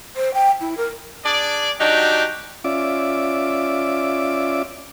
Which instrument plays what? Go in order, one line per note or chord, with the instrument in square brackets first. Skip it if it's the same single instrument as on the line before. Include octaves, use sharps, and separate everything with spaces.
[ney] C5
G5
E4
A#4
[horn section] D4 G#4 D5
F#3 D4 D#4 F#4 G4
[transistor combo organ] C#4 F4 D5 E5 D6